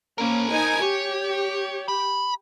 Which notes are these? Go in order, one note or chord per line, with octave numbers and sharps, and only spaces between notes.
A#3 C#4 A#4 C5
D#4 G#5
G4 C#5
B5